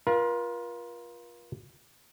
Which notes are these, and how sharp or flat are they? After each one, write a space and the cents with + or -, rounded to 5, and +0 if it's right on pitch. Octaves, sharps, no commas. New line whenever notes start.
F4 +0 A#4 +45